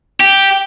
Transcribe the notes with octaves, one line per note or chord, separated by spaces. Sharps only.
G4